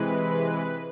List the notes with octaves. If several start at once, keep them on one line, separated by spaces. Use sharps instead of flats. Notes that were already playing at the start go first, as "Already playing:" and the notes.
Already playing: C3 E3 G#3 B4
B4